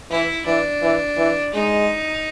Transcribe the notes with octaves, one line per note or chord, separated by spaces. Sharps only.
E3 E4
E3 D4
E3
E3
G#3 D#4